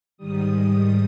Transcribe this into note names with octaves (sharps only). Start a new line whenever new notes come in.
G#2 D#3 G3 D#6
D#6